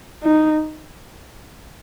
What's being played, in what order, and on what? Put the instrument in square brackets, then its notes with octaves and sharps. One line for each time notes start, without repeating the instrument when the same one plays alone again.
[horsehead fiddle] D#4